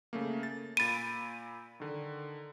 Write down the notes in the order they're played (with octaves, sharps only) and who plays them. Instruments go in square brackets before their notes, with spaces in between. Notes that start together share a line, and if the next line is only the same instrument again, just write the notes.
[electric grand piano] C#3 A3 A#3
A6
[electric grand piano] A#2 B5 D7 [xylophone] A6 D#7
[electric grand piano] D3 D#3